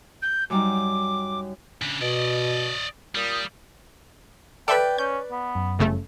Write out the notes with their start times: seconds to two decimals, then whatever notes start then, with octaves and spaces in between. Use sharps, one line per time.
0.22 G6
0.50 F#2 G3 D#4 D6
1.82 C#3 D4
2.01 B2 D5 D#5
3.15 A#2 G3 D#6
4.68 A4 B4 D5 E5 G5 B5
4.98 C#4 G6
5.31 B3
5.55 F#2
5.79 G1 C#3 A3